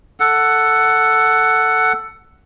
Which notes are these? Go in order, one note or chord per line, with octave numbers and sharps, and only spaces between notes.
A4 F#5